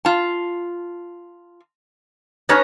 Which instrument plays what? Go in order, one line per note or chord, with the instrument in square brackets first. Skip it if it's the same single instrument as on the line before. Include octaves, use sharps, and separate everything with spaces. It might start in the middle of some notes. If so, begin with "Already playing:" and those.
[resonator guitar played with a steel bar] F4 A5
[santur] C#4 A5 A#5 [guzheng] D#4 B4 C#5